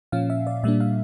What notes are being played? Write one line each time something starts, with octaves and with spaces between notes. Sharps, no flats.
A#2 F3 C#4 F5
E5
D5
A#2 G3 A#3 D4 E5
F5